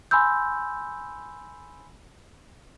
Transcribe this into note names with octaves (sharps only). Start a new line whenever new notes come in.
G#5 B5 C6 E6 G6